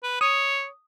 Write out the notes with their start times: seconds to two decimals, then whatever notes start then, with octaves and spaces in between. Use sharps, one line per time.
0.03 B4
0.21 C#5 D#6